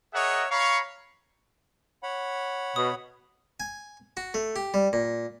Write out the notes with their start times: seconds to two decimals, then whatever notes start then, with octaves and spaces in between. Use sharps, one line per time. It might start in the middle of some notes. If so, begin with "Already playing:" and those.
0.13 G#4 A#4 C#5 D#5 E5 F#5
0.50 C#5 F5 A#5 B5 C#6
2.03 C#5 F#5 B5
2.76 B2 D#6
3.60 G#5
4.17 F#4
4.34 A3
4.56 G4
4.74 G3
4.93 A#2